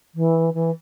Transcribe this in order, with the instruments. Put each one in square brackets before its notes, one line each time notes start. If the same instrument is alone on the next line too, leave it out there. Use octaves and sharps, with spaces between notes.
[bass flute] E3
E3